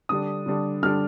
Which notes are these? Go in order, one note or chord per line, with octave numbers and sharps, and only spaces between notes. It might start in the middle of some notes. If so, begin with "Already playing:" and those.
D3 G3 D4 D#6
D3 G3 D4
D3 G3 D4 F6